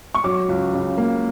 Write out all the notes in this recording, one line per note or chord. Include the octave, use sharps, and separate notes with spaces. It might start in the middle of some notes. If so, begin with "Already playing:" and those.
C#6
F#3 D6
C#2
C#3
A#3